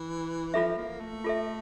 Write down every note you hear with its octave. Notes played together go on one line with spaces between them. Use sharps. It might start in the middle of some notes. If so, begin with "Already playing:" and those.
Already playing: E3
F3 F4 A4 E5
A#3
A3
F4 A4 E5